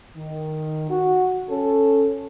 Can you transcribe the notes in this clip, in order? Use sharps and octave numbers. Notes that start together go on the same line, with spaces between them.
D#3
F#4
C#4 A4